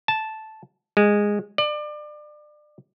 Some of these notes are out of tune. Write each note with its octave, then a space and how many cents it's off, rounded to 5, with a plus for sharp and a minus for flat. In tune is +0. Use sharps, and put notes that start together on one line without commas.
A5 -5
G#3 -10
D5 +30